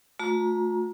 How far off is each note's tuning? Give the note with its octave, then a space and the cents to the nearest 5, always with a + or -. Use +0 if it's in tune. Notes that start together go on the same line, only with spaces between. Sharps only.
A3 -10 F4 +45 A#5 +15